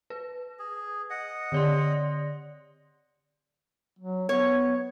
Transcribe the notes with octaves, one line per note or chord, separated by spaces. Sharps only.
B4
G#4
D#5 F#5
D3 D5 C6
F#3
B3 C#5